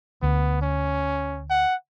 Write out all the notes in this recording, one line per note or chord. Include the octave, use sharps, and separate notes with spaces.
D2 B3
C#4
F#5